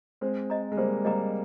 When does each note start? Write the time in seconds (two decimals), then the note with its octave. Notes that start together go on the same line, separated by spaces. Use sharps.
0.21 G#3 C4 C5
0.50 D#5 A#5
0.72 G#3
0.77 G3 A#3 C5
1.05 G3 A#3 D#5 A#5